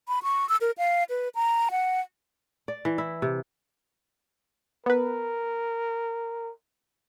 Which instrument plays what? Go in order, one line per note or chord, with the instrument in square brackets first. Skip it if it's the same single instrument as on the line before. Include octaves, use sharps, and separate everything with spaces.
[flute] B5
C#6
E6
A#4
F5
B4
A#5
F#5
[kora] D5
E3
E4
C3
[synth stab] B3 B4 [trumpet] A#4